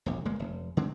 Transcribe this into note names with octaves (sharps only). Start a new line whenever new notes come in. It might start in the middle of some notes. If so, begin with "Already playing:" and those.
E1 A#1
G1 G#3 A#3
F1
D3 G#3 C4